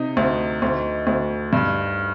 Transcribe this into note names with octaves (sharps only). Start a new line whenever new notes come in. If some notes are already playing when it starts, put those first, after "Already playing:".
Already playing: C3 D#4
D2
D2
D2
G2